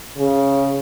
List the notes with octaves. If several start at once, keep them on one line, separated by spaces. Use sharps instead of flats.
C#3